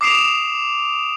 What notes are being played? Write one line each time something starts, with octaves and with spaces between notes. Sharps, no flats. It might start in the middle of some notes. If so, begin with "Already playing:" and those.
D6 D#6 C7 D7 E7 F7